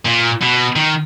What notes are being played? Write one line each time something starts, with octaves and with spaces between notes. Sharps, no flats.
A#2
B2
D#3